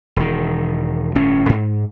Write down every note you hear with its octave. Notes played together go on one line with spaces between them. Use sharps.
E1 D#3
G1 A2 C#4
G#2